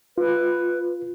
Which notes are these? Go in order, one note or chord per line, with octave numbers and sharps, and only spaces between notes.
F4 B4